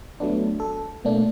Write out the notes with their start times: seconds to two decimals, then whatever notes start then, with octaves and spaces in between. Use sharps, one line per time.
0.20 F#3 A3 B3 D4
0.60 A4
1.05 B2 A3 A#3 D4